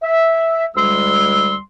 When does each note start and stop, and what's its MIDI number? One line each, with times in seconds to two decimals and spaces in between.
0.02 0.65 76
0.76 1.55 38
0.76 1.55 55
0.76 1.55 56
0.76 1.55 84
0.76 1.55 88